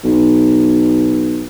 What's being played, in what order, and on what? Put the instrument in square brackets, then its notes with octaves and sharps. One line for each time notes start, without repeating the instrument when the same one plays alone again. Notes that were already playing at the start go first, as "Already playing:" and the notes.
[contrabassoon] B1